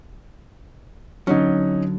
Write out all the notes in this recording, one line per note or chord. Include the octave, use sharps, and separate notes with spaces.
D3 F#3 C#4 D#4